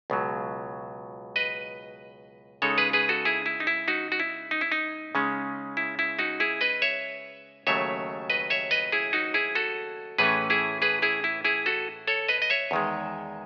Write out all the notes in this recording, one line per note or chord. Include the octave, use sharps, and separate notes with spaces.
C#2 B2 F#3
B4 D#5
C#3 G#3 D#4 A4 C#5
G#4 B4
G#4 B4
F#4 A4
E4 G#4
E4
D#4
E4
D#4 F#4
F#4
E4
D#4
E4
D#4
C#3 G#3 C#4
E4
E4
D#4 F#4
E4 G#4
B4 D#5
C#5 E5
D#2 C#3 F#3 A3 C#5 E5
B4 D#5
C#5 E5
B4 D#5
E4 G#4
D#4 F#4
E4 G#4
F#4 A4
A2 E3 A3 C#4 G#4 B4
E4 G#4
G#4 B4
E4 G#4
E4
E4 G#4
F#4 A4
A4 C#5
B4 D#5
D#5
C#5 E5
E2 D#3 G#3